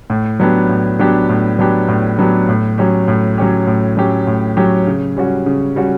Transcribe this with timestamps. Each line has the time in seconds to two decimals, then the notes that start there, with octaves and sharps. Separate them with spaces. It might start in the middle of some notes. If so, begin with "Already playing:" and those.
0.10 A2
0.40 F#3 B3 D4 G4
0.69 A2
0.99 F#3 B3 D4 G4
1.29 A2
1.59 F#3 B3 D4 G4
1.88 A2
2.19 F#3 B3 D4 G4
2.49 A2
2.78 F#3 C#4 G4
3.08 A2
3.38 F#3 C#4 G4
3.67 A2
3.97 F#3 C#4 G4
4.27 A2
4.57 F#3 C#4 G4
4.87 C#3
5.17 G3 C#4 F#4
5.46 C#3
5.76 G3 C#4 F#4